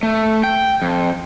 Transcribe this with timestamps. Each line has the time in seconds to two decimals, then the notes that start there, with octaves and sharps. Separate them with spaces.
0.03 A3
0.44 G5
0.82 F2